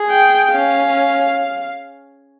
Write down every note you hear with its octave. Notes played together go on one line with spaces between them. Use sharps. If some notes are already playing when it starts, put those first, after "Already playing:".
Already playing: G#4
G5
C#4 F5